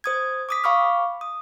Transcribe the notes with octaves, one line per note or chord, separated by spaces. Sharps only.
C5 D#6 G#6
D6 D#6 B6
F5 B5 C#6 D6 F6
D#6